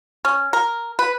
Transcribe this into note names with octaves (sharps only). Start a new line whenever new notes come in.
C#4
A#4
B4